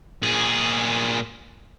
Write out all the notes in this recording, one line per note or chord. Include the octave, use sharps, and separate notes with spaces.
A#2 G#4